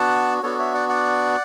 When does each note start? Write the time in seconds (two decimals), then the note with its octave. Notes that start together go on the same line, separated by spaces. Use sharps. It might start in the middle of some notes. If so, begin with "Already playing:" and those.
Already playing: B3 D4 F#4 F#5 A5
0.43 B3 D4 F#4 A4 C#5
0.58 C#5 E5
0.74 D5 F#5
0.89 D5 F#5